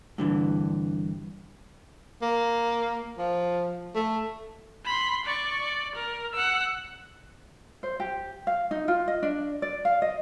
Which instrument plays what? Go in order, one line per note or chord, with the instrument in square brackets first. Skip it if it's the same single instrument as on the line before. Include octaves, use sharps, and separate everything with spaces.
[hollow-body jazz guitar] G2 D3 E3
[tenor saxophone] A#3
F3
A3
[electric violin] B5 C6
D5 C#6
D5
A#4
F#5 E6
[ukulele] C5
G4
F5
D#4
F4
D#5
D4
D5
F5
D#5